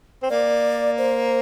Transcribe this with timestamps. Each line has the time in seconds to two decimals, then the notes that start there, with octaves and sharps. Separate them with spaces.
0.23 C4
0.30 A#3 D5
0.98 C5